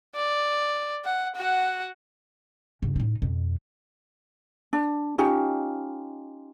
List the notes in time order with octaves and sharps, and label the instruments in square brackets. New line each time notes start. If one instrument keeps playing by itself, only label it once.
[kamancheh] D5
F#5
F#4 F#5
[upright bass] G2 C#3
A2 D#4
F2 B2
[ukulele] D4
C#4 D#4 F4 G4